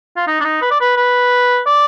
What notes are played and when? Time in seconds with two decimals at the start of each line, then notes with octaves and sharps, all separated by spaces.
0.16 F4
0.27 D#4
0.40 D4
0.44 D#4
0.62 B4
0.71 D5
0.80 B4
0.97 B4
1.66 D5